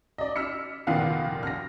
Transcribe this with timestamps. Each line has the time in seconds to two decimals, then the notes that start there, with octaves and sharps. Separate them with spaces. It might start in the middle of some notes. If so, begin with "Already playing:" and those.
0.18 D5 D#5
0.36 E6 F6 B6 C#7
0.87 F1 A#2 D#3 B3 F5 F#5
1.43 F6 A#6